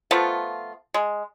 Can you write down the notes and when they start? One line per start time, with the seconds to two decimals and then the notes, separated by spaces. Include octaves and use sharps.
0.11 F3 A3 B3 F4
0.94 G#3